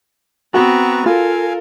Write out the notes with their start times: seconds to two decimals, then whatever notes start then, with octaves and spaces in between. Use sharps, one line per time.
0.54 B3 C4 F#4 B4 A#5 C#6
1.06 F4 A4 A#4 F5 G#5